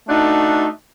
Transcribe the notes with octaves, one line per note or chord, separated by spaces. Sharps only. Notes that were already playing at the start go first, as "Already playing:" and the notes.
A3 D4 D#4 F#4